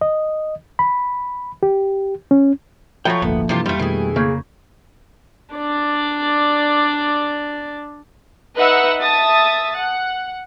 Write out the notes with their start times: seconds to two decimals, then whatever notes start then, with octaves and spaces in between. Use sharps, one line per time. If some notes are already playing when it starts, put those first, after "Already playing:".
0.01 D#5
0.79 B5
1.63 G4
2.31 C#4
3.05 F3 F#3 A3 C#5 G5 B5 A#6
3.22 D#1 G#1 D2 A#3 B3 A4 E5
3.49 G2 C3 E3 F4 G4
3.66 F2 G3 A3 F4
3.79 B2 D#3 E3 A3 G#4
4.16 C#3 A#3 C#6 G6 G#6
5.55 D4 D5
8.57 D#4 B4 D#5 E5 F#5 E6
9.01 E5 A5 D#6 A6
9.75 F#5